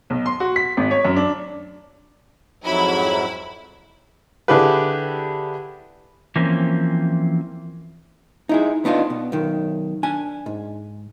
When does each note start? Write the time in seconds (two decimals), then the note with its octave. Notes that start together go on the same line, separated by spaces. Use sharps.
0.10 B1
0.26 C6
0.40 F#4
0.56 B6
0.77 G#1
0.91 C#5
1.05 F#2
1.17 D4
2.64 F2 G#2 F#3 E4 B5
4.48 D3 D4 E4 G4 G#4 B4
6.36 E3 F3 A#3 C4 C#4
8.49 D#4 E4 G#4
8.85 B3 D4 D#4 F4
9.10 B2
9.32 B1 D#3
10.03 D4 G#5
10.46 G#2